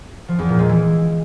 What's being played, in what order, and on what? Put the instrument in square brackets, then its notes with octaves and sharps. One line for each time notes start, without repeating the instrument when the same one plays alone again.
[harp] F3
E2
A#2
G#3
E3